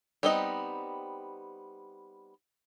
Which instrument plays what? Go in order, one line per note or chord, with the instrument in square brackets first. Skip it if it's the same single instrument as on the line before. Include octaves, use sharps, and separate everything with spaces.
[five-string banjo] G3 B3 C4 D#4 D#5